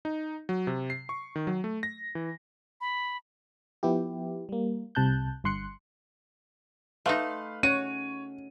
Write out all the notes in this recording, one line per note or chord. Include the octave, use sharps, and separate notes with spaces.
D#4
F#3
C3
C7
C#6
D#3
F#3
A3
A#6
E3
B5
F3 B3 E4 G4
G3 A#3
C2 C3 A5 F#6 G6
G1 G2 C6 F#6 C#7
A3 D#4 B4 F5 C6
C#4 F#4 C#5 D#7